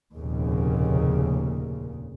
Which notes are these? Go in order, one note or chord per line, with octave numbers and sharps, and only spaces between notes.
F1 D#2 A#2 C#3